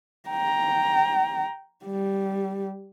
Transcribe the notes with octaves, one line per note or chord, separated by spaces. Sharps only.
G5 A#5
G3